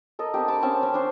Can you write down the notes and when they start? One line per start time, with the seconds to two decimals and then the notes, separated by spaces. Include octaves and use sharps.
0.19 A4 A#4 D#5
0.34 C4 D4 G4
0.48 A5 B5 D6
0.63 C4 C#4 A5
0.83 C#4
0.94 D4 C5